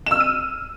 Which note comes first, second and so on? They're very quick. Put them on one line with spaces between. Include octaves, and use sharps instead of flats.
E7 E6 F6 D#7